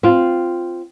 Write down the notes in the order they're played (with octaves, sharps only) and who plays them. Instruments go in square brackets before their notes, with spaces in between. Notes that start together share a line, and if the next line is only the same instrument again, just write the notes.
[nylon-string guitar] C4 F4